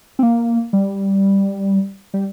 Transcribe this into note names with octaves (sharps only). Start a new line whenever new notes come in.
C4
A#3
G3
G3